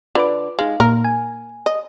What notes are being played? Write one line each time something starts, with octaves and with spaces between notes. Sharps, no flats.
D3 F4 B4 D6
G#3 D#4 F5
A#2 A#3 A#4
G#5
D#5